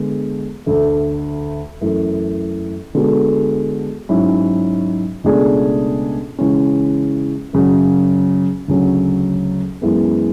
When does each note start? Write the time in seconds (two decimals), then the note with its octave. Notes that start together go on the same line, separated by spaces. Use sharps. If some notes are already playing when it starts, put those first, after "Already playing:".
Already playing: D3 G#3 B3
0.66 D2 D3 A3
1.81 F#2 E3 A3
2.95 D3 G#3 B3 F#4 A4
4.09 G#2 F#3 C#4 E4
5.24 C#2 B2 A3 D4 G#4
6.39 C#3 E3 G#3 C#4
7.53 F#2 C#3 F#3
8.68 D2 C#3 F#3 C#4
9.82 F#2 E3 G#3 B3